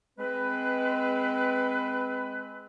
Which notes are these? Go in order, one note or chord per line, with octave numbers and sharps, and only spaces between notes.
G#3 C4 B4